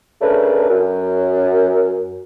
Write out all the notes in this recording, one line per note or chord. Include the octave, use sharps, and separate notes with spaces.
C#3 A3 C#4 D4 A#4 B4
F#2